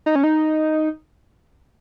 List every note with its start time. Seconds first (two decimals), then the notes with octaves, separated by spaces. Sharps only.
0.06 D#4
0.15 C#4
0.24 D#4